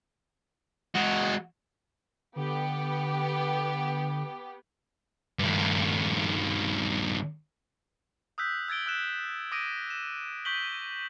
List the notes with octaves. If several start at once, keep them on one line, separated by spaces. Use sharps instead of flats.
G#3 F#4
D3 B3 G4
G2 D#3
D#6 E6 F#6 G6 B6
E6 G#6 A6 D7 G7
E6 F#6 E7
D6 D#6 A#6 D7 D#7
E7
C#6 G6 B6 F#7 G7